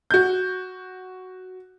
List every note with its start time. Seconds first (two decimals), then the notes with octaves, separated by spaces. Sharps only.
0.11 F#4 G6